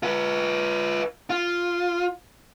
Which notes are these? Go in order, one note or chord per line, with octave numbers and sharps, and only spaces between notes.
F4 B4
F4